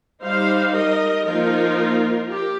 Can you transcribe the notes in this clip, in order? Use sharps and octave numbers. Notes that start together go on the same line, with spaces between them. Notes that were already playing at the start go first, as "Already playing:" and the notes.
G3 D#4 C5 F5
A#4 D#5
F3 A#3 D#4 F4 A#4
G4